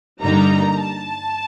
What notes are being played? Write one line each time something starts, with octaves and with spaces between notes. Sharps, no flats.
G2 D3 G3 A#3 D#4 A#5
A5